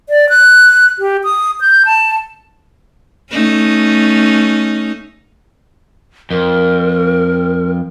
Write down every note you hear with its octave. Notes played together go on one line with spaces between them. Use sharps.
D5
F#6
G4
D#6
G6
A5
A3 C#4 D#4
F2 A#4